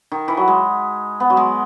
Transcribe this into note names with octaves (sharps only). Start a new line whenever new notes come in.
D#3
E3
F#3
G#3
B3
F#3
G#3